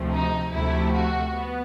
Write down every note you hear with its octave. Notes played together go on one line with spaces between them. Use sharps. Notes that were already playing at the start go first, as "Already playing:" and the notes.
Already playing: D2 C3 F3 A3
D#4
D2 C3 F3 A3 E4
F#4
B3